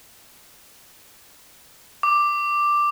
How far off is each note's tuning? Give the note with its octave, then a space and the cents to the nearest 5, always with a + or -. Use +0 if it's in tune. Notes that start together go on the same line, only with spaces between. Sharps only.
D6 +5